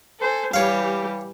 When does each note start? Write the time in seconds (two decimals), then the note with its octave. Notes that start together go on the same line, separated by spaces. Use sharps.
0.20 A4 C5 G#5
0.54 E3 G3 G4 C#5 F5